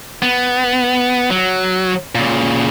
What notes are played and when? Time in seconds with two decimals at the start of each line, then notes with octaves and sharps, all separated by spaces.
0.22 B3
1.30 F#3
2.15 A#2 C#3